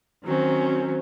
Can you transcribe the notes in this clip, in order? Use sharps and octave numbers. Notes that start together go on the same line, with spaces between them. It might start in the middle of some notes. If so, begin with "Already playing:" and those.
D#3 F#3 C4 C#4